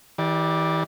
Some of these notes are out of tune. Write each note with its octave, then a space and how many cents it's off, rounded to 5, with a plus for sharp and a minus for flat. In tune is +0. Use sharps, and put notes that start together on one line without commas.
E3 -35 G4 +0 D5 +0